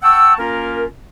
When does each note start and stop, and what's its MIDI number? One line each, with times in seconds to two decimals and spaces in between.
0.03 0.34 78
0.03 0.34 79
0.03 0.34 81
0.03 0.34 85
0.03 0.34 88
0.38 0.85 58
0.38 0.85 61
0.38 0.85 65
0.38 0.85 70